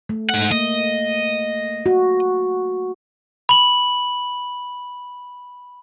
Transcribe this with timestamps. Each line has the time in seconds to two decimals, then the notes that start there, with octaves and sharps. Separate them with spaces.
0.09 A3
0.29 G#2 F#5
0.52 A#3 D#5
1.86 F#4
3.49 B5 F#7